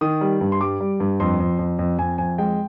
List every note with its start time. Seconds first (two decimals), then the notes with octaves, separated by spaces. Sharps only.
0.01 D#3 D#6
0.21 G3
0.41 G2
0.52 C6
0.61 G3 D6
0.80 G3
1.00 G2
1.20 F2 C6
1.40 F2
1.59 F2
1.79 F2
1.98 F2 G#5
2.18 F2 G#5
2.38 G#3 G5